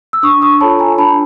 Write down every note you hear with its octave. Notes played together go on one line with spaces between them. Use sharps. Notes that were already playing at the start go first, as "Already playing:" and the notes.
E6
D4 C#6 D#6
C#6 D#6
F4 A4 C#5 A5 B5
G#5 A#5
D4 A5 B5